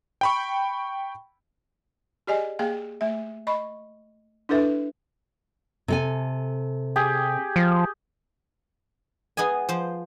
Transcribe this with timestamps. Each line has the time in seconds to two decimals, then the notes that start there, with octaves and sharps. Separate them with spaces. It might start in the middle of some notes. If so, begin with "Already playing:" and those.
0.21 G5 B5 C#6
2.27 G4 G#4 D5 D#5 G#5
2.59 A#3 G#4 F5 G5
3.01 A3 E5
3.47 D#5 B5 C#6
4.49 D4 E4 A4 B4 E5
5.88 C3 A4 G#5
6.96 G4 G#4
7.56 F3
9.37 B3 G#4 D#5 G#5
9.69 F3 C5